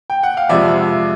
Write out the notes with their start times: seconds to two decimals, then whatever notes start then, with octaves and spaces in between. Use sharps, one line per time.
0.10 G5
0.23 F#5
0.37 F5
0.49 F2 C3 F3 G#3 D5 E5